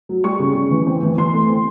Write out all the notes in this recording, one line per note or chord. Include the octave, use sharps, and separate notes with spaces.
F#3
G3 C#6
C#3
C#3
E3
C4
E3
E3 C6
A3
C4